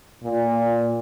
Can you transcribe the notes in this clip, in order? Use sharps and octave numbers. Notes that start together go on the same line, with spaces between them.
A#2